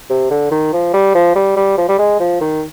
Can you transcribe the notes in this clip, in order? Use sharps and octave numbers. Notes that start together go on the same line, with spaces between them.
C3
D3
D#3
F3
G3
F3
G3
G3
F3
G3
G#3
F3
D#3